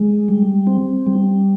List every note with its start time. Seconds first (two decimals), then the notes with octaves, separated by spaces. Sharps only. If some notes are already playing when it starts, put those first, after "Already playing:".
Already playing: G#3
0.28 G3
0.67 C4
1.06 G3